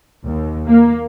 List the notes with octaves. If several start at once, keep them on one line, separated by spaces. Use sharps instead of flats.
D#2
A#3